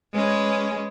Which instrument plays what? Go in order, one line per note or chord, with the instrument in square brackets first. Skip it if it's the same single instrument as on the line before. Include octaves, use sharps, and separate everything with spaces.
[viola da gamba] G#3 C#4 B4